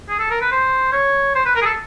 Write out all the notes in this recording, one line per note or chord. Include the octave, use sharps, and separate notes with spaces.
G#4
A4
A#4
B4
C5
C#5
C5
B4
A#4
G#4
A4